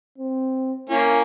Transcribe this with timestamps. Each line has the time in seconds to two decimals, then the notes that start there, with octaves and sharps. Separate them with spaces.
0.18 C4
0.90 A#3 C#4 E4